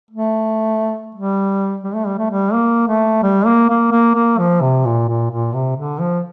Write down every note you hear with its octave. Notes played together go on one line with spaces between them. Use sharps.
A3
G3
G3
A3
G3
A3
G3
A#3
A3
G3
A#3
A#3
A#3
A#3
F3
C3
A#2
A#2
A#2
C3
D3
F3